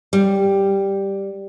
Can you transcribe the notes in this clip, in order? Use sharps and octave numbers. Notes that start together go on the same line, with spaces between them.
G3